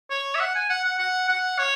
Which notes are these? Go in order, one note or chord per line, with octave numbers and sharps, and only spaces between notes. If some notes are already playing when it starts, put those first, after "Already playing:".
C#5
E5
F#5
G#5
F#5
F#5
F#5
F#5
C#5